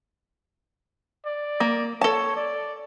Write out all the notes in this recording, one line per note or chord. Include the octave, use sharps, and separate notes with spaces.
D5
A#3
A4 C#5 A5
D5